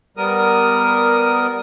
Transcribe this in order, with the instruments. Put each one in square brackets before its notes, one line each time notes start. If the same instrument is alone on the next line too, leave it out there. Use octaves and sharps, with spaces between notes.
[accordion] G3 B3 A#4 D#6